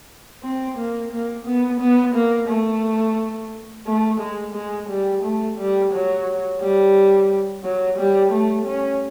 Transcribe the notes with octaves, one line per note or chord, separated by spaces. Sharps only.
C4
A#3
A#3
B3
B3
A#3
A3
A3
G#3
G#3
G3
A3
G3
F#3
G3
F#3
G3
A3
C#4